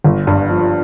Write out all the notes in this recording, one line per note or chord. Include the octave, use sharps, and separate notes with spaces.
G1
G2
F3